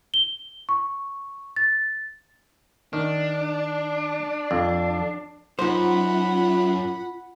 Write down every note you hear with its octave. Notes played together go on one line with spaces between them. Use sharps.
G7
C#6
A6
D#3 D4
F2
F#2 D#4 F4 C5 F#5 B5